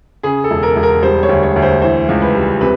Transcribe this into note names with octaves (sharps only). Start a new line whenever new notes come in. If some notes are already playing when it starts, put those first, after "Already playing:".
C#3 G#4
A4
E1
A#4
E1
A#4
G3 C5
C#5
D2
C#5
D2
C5
E3 C5
C#2
B4
G3
C3 B4